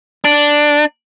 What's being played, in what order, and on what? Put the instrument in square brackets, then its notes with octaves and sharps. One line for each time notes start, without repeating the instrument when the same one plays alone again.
[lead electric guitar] D4